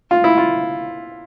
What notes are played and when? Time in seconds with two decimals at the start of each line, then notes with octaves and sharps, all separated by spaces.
0.11 F4
0.24 E4
0.38 F4